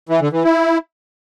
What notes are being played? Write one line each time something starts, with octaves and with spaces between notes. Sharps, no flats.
E3
D3
E3
E4